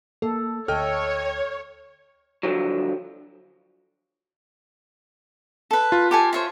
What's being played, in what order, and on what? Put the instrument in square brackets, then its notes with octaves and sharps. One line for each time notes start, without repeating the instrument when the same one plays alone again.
[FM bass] A#3 [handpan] A4
[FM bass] D2 [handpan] A4 [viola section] C#5 [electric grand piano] D#5 G5 F6
[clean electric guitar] G2 D3 D#3 F3 F#3
[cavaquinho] A4 B4
[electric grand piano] F4
[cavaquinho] G4 A4 G#5
C5 C#5 E5